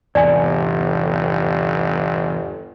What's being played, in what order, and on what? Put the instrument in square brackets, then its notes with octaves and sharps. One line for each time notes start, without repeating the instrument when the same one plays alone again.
[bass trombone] G1 [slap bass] E2 G#2 C3 [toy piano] D5 G#5